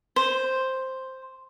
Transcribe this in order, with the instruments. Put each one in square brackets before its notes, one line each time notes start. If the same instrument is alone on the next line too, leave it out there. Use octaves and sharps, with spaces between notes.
[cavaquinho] C5